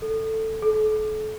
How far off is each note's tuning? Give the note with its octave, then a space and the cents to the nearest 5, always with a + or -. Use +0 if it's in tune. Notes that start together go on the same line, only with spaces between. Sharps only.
A4 +10
A4 -35